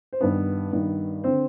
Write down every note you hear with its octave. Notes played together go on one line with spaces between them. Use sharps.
C5
G2 D#3 B3 B4
G2 D#3
D3 C4 C5